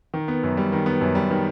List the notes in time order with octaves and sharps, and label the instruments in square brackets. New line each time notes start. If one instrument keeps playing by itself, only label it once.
[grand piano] D#3
B3
F#2
G3
D#3
B3
F#2
G3
D#3